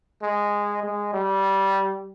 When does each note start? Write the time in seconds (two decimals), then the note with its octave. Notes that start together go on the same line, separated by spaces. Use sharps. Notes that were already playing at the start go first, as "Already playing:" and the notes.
0.22 G#3
0.83 G#3
1.14 G3